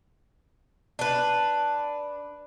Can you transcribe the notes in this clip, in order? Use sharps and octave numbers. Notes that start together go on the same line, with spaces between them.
D4 B4